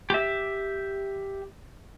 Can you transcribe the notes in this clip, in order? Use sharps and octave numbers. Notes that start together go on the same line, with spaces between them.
G4 E5